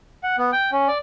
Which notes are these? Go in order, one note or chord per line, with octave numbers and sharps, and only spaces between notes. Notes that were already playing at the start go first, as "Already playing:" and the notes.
F#5
B3
G5
C#4
D5